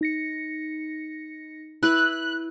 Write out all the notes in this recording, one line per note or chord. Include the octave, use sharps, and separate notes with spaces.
D#4 A#6 C#7
E4 B4 F#6